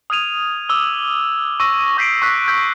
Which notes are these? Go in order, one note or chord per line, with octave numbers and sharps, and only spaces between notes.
D#6 F6 G#6 D#7 F7
D6 E6 G7
C#6 E6 A#6
C#6 G6 B6 C7 D7
C#6 F#6 B6
E6 F#6 G6 B6